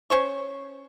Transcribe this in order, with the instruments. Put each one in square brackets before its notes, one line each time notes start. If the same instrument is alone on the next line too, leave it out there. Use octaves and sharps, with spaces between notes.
[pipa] C#4 C5 C#6